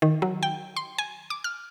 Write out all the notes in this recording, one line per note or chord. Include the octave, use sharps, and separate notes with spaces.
D#3
F#3
G5
C6
G#5
D6
F6